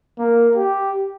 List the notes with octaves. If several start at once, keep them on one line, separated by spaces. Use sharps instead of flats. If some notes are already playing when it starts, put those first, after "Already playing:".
A#3
G4